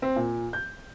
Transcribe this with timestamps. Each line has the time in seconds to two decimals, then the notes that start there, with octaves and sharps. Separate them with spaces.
0.02 C4
0.16 A#2
0.53 G6